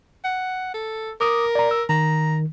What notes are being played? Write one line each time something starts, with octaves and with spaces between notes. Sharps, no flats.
F#5
A4
A#4 D6 D#6
D5 A#5
E6
D#3 A#5